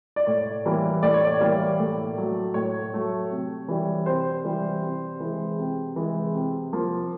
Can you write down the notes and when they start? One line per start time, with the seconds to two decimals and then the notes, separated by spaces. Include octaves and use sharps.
0.16 D5
0.27 A2 C#5
0.66 E3 G3 A#3
1.02 A2 D5
1.14 C#5
1.24 D5
1.41 E3 G3 A#3
1.79 A2
2.17 F#3 A3
2.54 A2 C#5
2.93 F#3 A3
3.31 C3
3.68 E3 G3
4.06 C3 C5
4.45 E3 G3
4.83 C3
5.20 E3 G#3
5.59 C3
5.96 E3 G#3
6.35 C3
6.73 F3 A#3